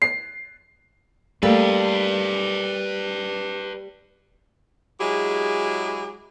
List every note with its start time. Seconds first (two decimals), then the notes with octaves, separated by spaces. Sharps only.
0.02 C7
1.43 G3 A3 A#3 A4 B4 D5
5.00 F#3 G#3 E4 G4 G#4